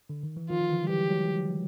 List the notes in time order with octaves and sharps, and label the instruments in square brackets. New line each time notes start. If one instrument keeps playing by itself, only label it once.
[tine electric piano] D3
D#3
E3
[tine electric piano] D#3 F3 [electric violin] F4
[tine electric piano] D#3
D3 E3
G3
[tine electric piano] E3 F#3 [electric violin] G4
[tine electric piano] F#3 G#3